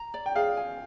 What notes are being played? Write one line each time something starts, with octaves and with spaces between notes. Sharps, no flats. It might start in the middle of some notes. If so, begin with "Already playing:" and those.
Already playing: A#5
D5
G5
G#4 F5
G#5